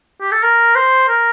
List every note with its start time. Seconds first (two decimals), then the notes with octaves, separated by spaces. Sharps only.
0.21 G4
0.32 A4
0.43 A#4
0.75 C5
1.08 A#4